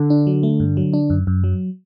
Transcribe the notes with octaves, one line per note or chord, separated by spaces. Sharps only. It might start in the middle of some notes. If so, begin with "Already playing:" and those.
Already playing: D3
D4
F#3
A3
G2
F#3
D4
F#2
F#2
F#3